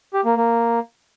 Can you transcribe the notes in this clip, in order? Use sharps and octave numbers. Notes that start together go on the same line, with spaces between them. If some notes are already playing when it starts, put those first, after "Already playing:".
G4
A#3
A#3